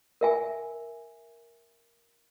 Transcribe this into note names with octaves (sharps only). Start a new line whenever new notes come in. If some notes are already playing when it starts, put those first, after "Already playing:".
A#4 E5 G#5